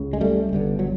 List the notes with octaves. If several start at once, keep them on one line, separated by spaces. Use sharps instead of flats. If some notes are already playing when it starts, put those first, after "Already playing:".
Already playing: C#2 C#3
G#3
G3 A3
G1 G2 D3
F#3